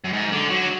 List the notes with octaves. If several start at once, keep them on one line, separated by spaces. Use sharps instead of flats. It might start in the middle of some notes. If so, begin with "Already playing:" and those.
F#2
G#2
D3
F#3